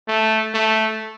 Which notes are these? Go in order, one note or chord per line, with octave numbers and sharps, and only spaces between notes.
A3
A3